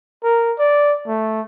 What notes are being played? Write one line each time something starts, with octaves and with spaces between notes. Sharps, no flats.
A#4
D5
A3